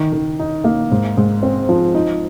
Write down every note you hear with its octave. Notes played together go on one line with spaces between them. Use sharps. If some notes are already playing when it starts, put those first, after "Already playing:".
Already playing: D#3
D#3
D#4
A#3
G#2
G#2
C4
F3
D#4